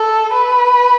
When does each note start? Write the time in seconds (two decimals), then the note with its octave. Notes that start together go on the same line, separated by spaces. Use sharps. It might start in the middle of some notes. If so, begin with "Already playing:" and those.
Already playing: A4
0.33 B4